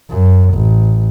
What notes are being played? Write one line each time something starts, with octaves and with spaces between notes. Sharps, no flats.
F#2
A1